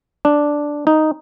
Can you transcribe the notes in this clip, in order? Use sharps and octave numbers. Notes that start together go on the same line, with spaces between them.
D4
D#4